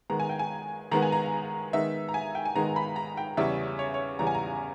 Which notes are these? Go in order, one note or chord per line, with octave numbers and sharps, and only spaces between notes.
D#3 G#3 B3 A#5
G#5
G5
G#5
D#3 G#3 B3 A#5
G#5
A#5
D#3 G#3 B3 D#4 E5
A#5
G#5
G5
G#5
D#3 G#3 B3 D#4 A#5
B5
A#5
G5
E2 C#3 G3 C#4 E5
C#5
C#5
E2 C#3 G3 C#4 A#5
G#5
A#5